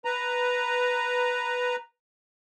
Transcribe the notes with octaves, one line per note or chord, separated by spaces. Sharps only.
B4 A#5